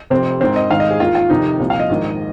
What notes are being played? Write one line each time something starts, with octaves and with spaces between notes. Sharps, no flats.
F1 F2 C3 C4
G#1 G#2 D#3 C4
D#5
G#1 G#2 D#3 F5
D#5
G#4
D#2 D#3 F4
F4
F1 F2 C3 D#3 D#4
C2 A#2 F3
F5
D#5
A#1 G#2 D#3